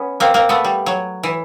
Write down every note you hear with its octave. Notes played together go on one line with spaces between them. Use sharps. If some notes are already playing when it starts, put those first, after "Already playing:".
Already playing: B3 C#4
A#3 C4
A#3 C4
A3 B3
G3
F#3
E3